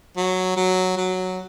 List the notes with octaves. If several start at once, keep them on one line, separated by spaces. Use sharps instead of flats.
F#3
F#3
F#3